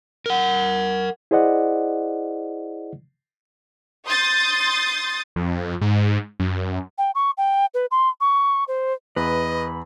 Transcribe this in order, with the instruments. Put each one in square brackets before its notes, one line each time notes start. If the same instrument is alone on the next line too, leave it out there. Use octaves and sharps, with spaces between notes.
[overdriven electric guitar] A#4 F#5
[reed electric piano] E4 G#4 C5 D5 D#5 F#5
[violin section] C6 D#6 G6 A6
[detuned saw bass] F2
G#2
F#2
[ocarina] G5
C#6
G5
B4
C6
C#6
C5
[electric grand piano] E2 [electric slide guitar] B4 [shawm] D#5 [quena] B5